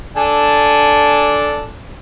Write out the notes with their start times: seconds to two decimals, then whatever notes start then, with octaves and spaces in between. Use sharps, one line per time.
0.16 D4 A4 G#5